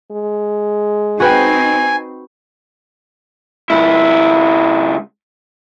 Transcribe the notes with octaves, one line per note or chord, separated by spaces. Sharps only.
G#3
C4 D#4 F#4 B4 G5 G#5
C#2 E4